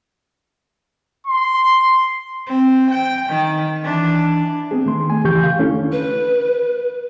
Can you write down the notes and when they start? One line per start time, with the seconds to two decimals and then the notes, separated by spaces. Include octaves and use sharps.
1.27 C6
2.47 C4
2.91 G5
3.29 D#3
3.82 E3 D4
4.71 B3 C4 G#4
4.86 D#3 A3 C6
5.10 G#5
5.24 F2 C#3 E3 G4 C#6 G6
5.43 F5
5.59 D#3 A3 C#4 D4 E4 A4
5.92 B4